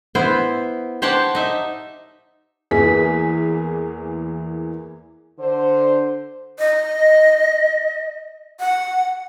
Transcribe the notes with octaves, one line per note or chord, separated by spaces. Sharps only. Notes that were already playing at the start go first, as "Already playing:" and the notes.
B3 E4 C5
G4 C5 C#5 F#5 G5 A5
D#4 E5
E2 E3 A#3 G#4 B6
D3 C5
D#5
F#5